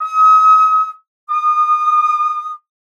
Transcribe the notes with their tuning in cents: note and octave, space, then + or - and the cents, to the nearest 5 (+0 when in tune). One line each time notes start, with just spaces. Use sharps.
D#6 +40
D#6 -30